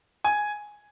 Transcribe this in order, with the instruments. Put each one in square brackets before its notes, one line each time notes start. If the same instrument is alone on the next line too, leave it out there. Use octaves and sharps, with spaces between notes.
[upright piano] G#5